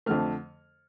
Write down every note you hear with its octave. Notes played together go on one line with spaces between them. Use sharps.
F2 D3 F3 A3 F6